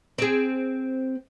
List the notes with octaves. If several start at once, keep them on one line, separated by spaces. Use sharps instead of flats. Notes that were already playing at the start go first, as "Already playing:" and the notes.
C4 G#4